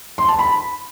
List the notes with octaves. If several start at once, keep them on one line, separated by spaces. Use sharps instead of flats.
C6
A5
B5